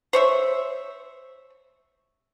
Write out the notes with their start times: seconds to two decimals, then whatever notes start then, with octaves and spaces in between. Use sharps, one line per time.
0.13 C5 C#5 E5